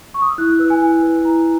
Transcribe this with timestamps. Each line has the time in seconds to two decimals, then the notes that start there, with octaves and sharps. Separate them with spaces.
0.14 C#6
0.22 D#6
0.30 E6
0.38 E4 F#6
0.49 F#6
0.59 B4 E6
0.70 G#5
0.81 E4 G#5
1.03 B4
1.25 E4 A#5